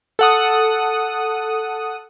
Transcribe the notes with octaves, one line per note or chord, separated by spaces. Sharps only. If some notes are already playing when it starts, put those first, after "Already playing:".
A4 F#5 D#6